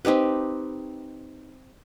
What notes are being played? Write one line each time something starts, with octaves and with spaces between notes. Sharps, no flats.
C4 D#4 G4 B4